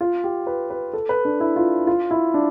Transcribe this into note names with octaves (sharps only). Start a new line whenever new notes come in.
F4
G4
B4
B4
A4
B4
D4
E4
F4
F4
E4
D4